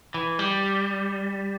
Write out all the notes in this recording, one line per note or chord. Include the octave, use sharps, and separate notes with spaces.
E3
G3